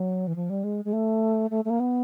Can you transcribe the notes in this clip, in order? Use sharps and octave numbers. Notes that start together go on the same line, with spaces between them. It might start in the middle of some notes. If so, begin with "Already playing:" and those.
Already playing: F#3
E3
F3
G3
G#3
G#3
A3
A3
A3
A#3
B3